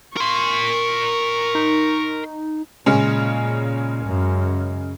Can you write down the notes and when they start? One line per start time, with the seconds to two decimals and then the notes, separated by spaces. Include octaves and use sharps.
0.17 A#4 C6 C#6
1.55 D#4
2.86 A#2 C#3 G#3 C#4
4.06 F#2